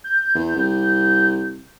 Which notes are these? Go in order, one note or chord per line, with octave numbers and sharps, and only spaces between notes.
G6
E2
C2